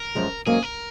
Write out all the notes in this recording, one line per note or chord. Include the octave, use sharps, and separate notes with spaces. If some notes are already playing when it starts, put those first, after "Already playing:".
Already playing: A#4
F#2 F3 G#3
G#2 F#3 A#3 C#4 G#4
A#4